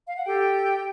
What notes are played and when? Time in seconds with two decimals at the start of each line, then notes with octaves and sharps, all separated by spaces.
0.07 F5
0.17 F#5
0.26 G4 A4 G5